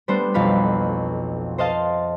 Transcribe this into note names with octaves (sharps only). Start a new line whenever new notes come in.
G3 A3 B3 D4 C5
B1 F2 F5 B5
C5 D#5 F5 A5